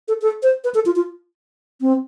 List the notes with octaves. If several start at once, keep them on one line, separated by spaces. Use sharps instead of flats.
A4
A4
C5
B4
A4
F4
F4
C4